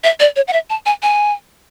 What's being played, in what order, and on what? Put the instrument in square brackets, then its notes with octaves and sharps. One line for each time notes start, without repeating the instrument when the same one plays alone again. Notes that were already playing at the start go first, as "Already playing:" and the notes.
[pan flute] E5
D5
C#5
F#5
E5
A5
G#5
G#5